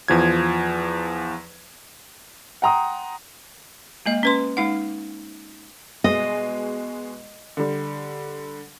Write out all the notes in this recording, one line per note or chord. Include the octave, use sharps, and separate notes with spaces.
E2 F3 G#6
F#5 G5 A#5 C6 D#6
G#3 A#3 D#5
C#4 B4 C6
G#3 D#4 F#5
B2 G#3 D#5
D3 G3